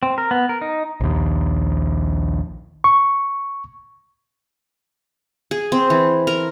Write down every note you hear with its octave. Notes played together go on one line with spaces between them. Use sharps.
C4
A#4
B3
A#4
D#4
A#1 D#2
C#6
G#4
C4
E3
A#4